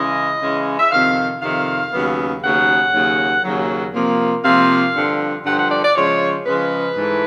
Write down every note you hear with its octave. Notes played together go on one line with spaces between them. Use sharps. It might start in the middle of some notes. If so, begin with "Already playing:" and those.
Already playing: C#3 E3 G#3 C#4 D#5
C#3 E3 G#3 C#4
E5
F2 C3 D#3 F5
F2 C3 D#3 F5
D#2 C#3 F#3 B3
D#2 C#3 F#3 B3 F#5
D#2 C#3 F#3
D#2 C#3 F#3
C3 F3 A#3
C3 F3 A#3 F5
G2 D3 F3
G2 D3 F3 F#5
F#5
D5
D5
C#3 F3 G#3 C#5
C#3 F3 G#3 B4
G#2 E3 A3